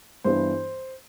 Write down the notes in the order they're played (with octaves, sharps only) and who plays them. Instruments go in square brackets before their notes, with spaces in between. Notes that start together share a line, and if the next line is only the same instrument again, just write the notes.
[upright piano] G2 E3 B3 D4 [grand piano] C5